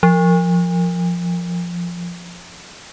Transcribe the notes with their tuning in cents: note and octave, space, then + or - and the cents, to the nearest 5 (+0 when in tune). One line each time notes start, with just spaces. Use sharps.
F3 +0